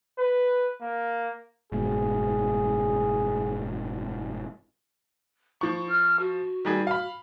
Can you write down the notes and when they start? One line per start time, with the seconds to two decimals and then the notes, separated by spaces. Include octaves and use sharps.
0.19 B4
0.82 A#3
1.72 F#1 G#2 B2 G#4
5.61 F3 E4 C#6
5.89 F6
6.19 F#4
6.65 D#3 G3 G#4
6.87 F5 B5